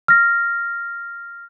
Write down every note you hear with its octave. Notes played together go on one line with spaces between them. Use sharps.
F6 A#6